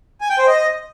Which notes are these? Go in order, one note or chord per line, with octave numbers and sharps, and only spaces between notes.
G#5
G5
C5
D#5